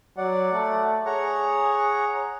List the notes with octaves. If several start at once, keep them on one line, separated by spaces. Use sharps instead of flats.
F#3 D5 F#5
A3
G#4 C#5 F#5 A#5